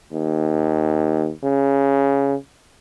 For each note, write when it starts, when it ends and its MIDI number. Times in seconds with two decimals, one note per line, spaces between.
0.13 1.30 39
1.44 2.34 49